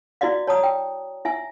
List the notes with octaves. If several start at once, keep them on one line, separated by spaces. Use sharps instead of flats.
E4 F#4 D5 D#5 F5
C#5 A5 A#5 D#6
G5
E4 E5 G#5